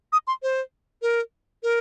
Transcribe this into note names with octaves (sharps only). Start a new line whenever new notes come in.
D#6
C6
C5
A#4
A#4